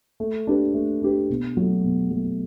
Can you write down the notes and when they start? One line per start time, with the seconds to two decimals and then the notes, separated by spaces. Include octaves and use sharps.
0.20 A3
0.47 D4 G4 B4
0.74 A3
1.02 D4 G4 B4
1.30 B2
1.57 F#3 A3
1.84 B2
2.11 F#3 A3